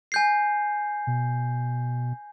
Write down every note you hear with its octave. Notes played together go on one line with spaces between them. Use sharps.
G#5 G6 C7
B2